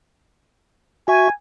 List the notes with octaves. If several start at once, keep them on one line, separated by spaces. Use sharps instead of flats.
F#4 E5 G#5 C#6